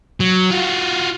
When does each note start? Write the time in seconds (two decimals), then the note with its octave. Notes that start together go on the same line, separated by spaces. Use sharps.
0.20 F#3
0.51 F4 F#4